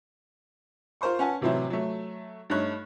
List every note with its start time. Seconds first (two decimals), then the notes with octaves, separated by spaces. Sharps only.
1.01 F4 A#4 C5 C6 C#6
1.19 C#4 B4 F#5 G#5 A5
1.41 A2 C3 E3 F#3 C4 E4
1.70 F#3 A3
2.50 G2 A3 D#4 C#5 F#6